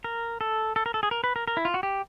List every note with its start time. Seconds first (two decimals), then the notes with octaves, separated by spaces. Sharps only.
0.04 A#4
0.41 A4
0.76 A4
0.86 A#4
0.94 A4
1.03 G#4
1.11 A#4
1.24 B4
1.36 A#4
1.48 A#4
1.57 E4
1.65 F4
1.74 F#4
1.83 G4